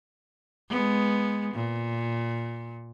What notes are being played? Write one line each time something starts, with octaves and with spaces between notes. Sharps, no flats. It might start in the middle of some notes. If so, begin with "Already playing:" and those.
G#3 B3
A#2